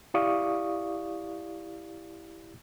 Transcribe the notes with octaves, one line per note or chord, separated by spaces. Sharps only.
E4 G4 D5 F5 C#6 D#6